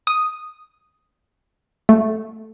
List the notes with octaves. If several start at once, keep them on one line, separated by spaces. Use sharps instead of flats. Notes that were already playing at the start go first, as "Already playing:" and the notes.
D#6
A3